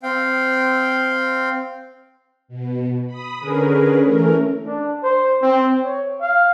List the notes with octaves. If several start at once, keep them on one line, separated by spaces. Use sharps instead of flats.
C4 F5 G5
B2
B5 D#6
D3 C#4 G#4 A#4 B4
E3 A3 C#4 A#4
D4
C5
C4
C#5
F5